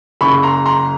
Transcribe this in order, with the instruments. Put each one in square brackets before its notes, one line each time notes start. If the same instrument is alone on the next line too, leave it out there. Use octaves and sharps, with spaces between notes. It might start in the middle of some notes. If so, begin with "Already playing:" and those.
[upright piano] F#1 F#2 C#3 B5 C#6
A#5 C6
A#5 C6